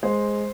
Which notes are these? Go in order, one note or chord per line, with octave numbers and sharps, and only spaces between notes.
G#3 C5